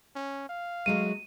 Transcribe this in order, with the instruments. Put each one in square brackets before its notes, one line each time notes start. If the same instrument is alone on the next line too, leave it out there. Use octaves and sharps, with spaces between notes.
[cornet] C#4
F5
[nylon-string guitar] F#3 G#3 A3 [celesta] D#7